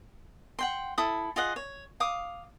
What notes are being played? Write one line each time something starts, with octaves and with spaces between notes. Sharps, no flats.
F#5 G5 C6
E4 A4 D#6
F4 G#4 D#5 F#5
C#5
F5 D6 D#6